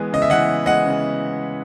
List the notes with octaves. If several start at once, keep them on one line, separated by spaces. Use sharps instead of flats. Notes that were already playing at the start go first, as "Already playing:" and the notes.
Already playing: E3 G#3 B3
C#3 D#5
E5
E3 D#5 F#5
B3
G#3 D#5 F#5
C#3